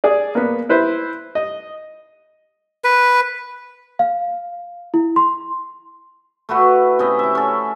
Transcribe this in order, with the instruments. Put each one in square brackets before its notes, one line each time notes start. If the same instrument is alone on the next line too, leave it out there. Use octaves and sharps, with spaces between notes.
[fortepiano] G#4 D5
A#3 B3
E4 B4 C5
D#5
[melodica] B4
[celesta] F5
E4
C6
[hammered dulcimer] A3 E4 F#4 B4
C3 C#4 E4 D#5
E4 E5
C#4 A4